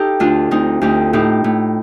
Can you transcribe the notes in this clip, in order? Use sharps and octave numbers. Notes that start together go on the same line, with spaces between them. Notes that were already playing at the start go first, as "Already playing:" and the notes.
Already playing: D#4 G4 A4 F5
D2 D4 F4
D2 C4 D#4
D2 D#4 G4
A2 D#4 G4
A2